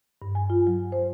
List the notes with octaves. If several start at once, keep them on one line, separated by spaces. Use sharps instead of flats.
G2
G#5
F4
F#3
C5